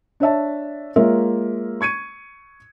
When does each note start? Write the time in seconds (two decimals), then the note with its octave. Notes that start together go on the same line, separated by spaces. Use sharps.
0.20 D4 C#5 E5 A5
0.96 G#3 A#3 F4 A#4 C#5 E5
1.81 C#6 G#6 C#7 D#7